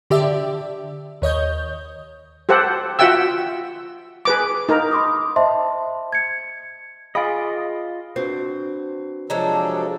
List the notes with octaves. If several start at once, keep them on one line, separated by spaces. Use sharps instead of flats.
D3 G4 D5 E5
D#2 C#5 D#5 G6
G4 A4 C5 F#5
F4 F#4 E5 F#5 G5 E6
G#4 B4 D6
D#4 A#4
B5 C6 D6 D#6
C5 D#5 E5 A5 C6
G#6 C#7
F4 G#4 D#5 F5 G#5 B5
C4 D4 F#4 B4
C3 F3 F#3 G#3 D4 A4 A#5